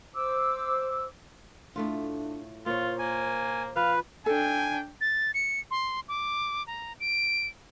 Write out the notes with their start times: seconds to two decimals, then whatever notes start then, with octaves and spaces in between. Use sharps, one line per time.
0.14 C5 D6 E6
1.76 A2 A3 D4 F4
2.66 A#2 F4 C5 C#5
2.99 A#3 G#5
3.76 F3 B4 F5
4.26 D4 A4 G5 G#5
5.01 A6
5.34 C#7
5.71 C6
6.08 D6
6.67 A#5
7.00 D7